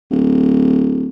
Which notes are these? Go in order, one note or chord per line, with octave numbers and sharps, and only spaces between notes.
D1